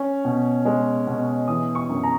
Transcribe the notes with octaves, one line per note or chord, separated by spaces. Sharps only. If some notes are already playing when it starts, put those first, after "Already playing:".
Already playing: C#4
B2
G#3
B2
E3 D#6
C#6
F#2
A#5